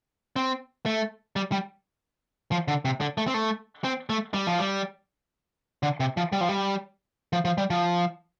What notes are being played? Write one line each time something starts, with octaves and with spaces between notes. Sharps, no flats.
C4
A3
G3
G3
F3
D3
C3
D3
A3
C4
A3
C4
A3
G3
F3
G3
D3
C3
F3
G3
F3
G3
F3
F3
G3
F3